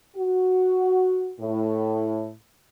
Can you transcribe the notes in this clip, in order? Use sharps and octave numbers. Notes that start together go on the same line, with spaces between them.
F#4
A2